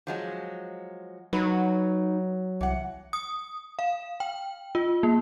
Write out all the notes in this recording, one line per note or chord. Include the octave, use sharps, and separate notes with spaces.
F3 F#3 G#3
F#3 D#4 B4
C2 E3 F#5
D#6
F5
G5
F4
A#3